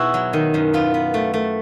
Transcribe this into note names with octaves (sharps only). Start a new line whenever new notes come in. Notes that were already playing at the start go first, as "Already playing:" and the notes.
Already playing: B2 E4 F#4 G#4
F#3
D#3
F#2
B3 F4
B3
A3
A3